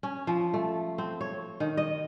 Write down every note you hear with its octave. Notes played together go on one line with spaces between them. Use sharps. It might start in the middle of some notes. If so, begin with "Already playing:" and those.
C#4
F3
A3
C4
C#5
D#3
D#5